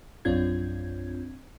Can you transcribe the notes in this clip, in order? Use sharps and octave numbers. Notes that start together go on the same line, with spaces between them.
A#1 F#2 C4 D4 F4 G#6